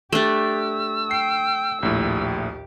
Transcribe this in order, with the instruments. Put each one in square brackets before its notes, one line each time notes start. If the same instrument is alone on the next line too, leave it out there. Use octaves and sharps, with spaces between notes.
[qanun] A3 D4 [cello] G4 [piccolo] E6
[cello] G5 [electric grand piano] C7
[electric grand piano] A#1 A2 [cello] D#2 G4